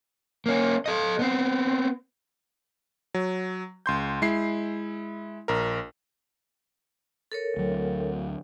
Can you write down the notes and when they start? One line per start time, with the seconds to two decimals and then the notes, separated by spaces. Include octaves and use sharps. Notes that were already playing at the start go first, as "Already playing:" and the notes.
0.46 A#3 C#4
0.86 A4 D#5
1.19 B3 C4
3.14 F#3
3.86 C#2 C6 G6
4.22 G#3 E4 C7
5.48 A#1 A#4
7.32 A4 A#4 C#5
7.57 D2 F#3